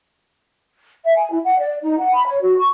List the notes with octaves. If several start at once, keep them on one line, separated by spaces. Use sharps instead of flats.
E5
G#5
E4
F#5
D5
D#4
F#5
B5
C#5
F#4
C#6